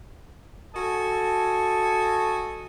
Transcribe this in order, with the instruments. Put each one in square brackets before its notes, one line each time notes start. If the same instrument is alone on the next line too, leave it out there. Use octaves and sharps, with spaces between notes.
[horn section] F#4 A4 D#5 G#5